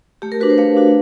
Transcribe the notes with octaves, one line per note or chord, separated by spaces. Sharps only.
A3 G4
A#4
D4 F#4 B4
C5
A3 F5
D4 F#4